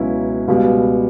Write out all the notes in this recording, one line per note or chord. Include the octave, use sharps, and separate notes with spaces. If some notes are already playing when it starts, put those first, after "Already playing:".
Already playing: C#2 B2 F#3 C#4 E4
C#2 B2 G3